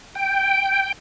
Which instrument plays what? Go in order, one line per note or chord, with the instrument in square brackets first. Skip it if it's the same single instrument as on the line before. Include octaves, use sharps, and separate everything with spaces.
[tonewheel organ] G5